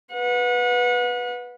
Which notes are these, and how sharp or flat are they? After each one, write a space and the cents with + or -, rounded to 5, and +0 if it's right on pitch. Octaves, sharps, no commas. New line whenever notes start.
B4 -5 F#5 -35